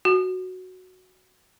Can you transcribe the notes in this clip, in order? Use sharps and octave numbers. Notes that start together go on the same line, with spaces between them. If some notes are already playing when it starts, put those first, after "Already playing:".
F#4